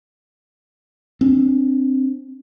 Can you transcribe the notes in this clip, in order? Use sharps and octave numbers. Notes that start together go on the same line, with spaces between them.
C4 D4